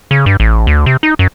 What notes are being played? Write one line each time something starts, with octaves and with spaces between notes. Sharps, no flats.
C#3
G2
A1
D2
C3
D#4
F#2